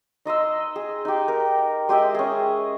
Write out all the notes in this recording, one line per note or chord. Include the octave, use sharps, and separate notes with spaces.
D#4 D#5 C6 E6
G#4
D#4 G4
A#4
G#3 G4 D#5 E5
C#4 G#4